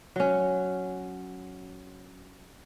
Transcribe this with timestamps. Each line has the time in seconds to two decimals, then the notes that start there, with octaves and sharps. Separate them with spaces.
0.16 F#3 C#4